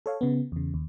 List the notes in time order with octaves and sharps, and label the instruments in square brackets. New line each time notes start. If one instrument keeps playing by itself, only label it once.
[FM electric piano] A4 C#5 F5
C#3 B3
E2 C#3
D#2